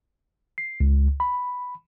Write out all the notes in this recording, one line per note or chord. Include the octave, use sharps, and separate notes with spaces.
C7
C#2
B5